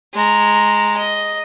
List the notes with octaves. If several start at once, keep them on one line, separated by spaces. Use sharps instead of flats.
G#3 A#5
D#5